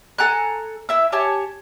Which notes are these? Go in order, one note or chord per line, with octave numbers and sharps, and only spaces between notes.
A4 G#5 A#5 F#6
E4 E5 E6
G4 C#5 G#5 A5